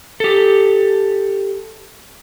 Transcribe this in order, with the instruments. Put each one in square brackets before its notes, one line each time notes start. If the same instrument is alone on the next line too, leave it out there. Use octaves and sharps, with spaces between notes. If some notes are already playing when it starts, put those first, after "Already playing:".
[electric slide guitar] G4 A4